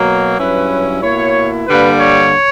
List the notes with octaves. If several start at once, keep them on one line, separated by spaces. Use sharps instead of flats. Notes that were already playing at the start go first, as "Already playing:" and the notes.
Already playing: B2 F#3 A#3
G2 F#3 C#4 E4 B4
B2 A#3 E4 C#5
G2 D3 G3 A#3 B4
C#5